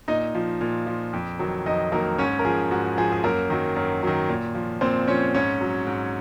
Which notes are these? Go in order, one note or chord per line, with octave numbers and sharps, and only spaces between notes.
A#2 D#4 D#5
F3
A#2
F3
F2
D#3 F#3
F2 D#4 D#5
D#3 F#3 A#3 A#4
G#2 C#4 C#5
A#4
F3 G#4
G#2 F#4
F3 G#4
G#4
F#2 A#3 A#4
D#3 F#3
F#2
D#3 F#3
A#2
F3
A#2 C4 C5
F3 C#4 C#5
G#2 C#4 C#5
F#3
G#2